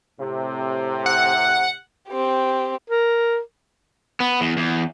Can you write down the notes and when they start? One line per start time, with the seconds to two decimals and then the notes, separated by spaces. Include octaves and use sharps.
0.20 A2 C3
1.06 F#5
2.09 C4 G4
2.90 A#4
4.20 B3
4.41 E2
4.57 E2